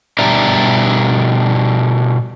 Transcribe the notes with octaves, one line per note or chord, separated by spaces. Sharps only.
B2 G3 D4 D5 E5 A#5